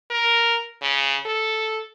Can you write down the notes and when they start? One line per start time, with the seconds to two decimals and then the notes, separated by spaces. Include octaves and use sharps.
0.11 A#4
0.82 C#3
1.26 A4